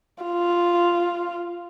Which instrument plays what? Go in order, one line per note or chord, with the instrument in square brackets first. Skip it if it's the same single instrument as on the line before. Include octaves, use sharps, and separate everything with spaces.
[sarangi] F4